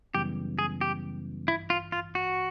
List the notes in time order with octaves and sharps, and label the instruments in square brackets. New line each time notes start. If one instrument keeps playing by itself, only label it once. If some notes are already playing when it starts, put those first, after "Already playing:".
[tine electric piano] F#2 C#3 E3 G3 B3 [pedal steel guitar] G4
[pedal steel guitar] G#4
G4
[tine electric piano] A1 G2 E3 [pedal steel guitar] E4
[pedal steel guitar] F4
F4
F#4